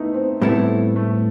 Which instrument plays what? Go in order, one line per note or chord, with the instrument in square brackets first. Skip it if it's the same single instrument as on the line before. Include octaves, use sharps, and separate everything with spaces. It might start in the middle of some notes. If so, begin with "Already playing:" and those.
Already playing: [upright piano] A3 B3 D#4 E4
C4
[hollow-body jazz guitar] A2 G3 C4 E4 A4 [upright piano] B3
[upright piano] A3